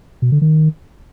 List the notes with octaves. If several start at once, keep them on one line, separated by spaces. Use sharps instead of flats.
B2
D3
D#3